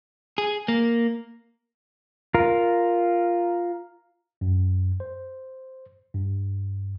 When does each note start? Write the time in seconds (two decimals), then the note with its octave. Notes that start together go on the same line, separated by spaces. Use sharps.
0.38 G#4
0.68 A#3
2.34 F4 A#4
4.41 F#2
5.00 C5
6.14 G2